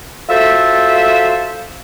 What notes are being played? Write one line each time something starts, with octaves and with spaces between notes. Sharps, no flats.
F4 F#4 A4 C5 E5